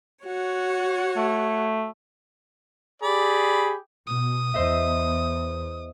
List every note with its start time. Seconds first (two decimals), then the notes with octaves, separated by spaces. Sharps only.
0.25 F#4 C#5 F#5
1.17 A3
3.02 G4 G#4 D5 B5
4.07 B2 D#6
4.54 E2 C5 D#5 E5